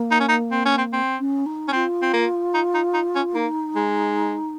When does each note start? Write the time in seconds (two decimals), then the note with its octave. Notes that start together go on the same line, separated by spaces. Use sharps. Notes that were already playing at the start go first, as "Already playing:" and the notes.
Already playing: A#3
0.11 D#4
0.20 C#4
0.29 D#4
0.51 C4
0.65 C#4
0.78 C4
0.93 C4
1.19 C#4
1.46 D#4
1.68 C#4
1.72 C4 F4
2.02 C4
2.13 A#3
2.54 D#4
2.74 D#4
2.94 D#4
3.15 C#4
3.34 A#3 D#4
3.75 G#3